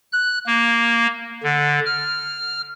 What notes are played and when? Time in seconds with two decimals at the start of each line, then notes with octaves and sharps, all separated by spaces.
0.12 F#6
0.46 A#3
1.43 D3
1.86 F6